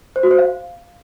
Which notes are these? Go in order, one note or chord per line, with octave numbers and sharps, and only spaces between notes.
C5
F#4
C5
F5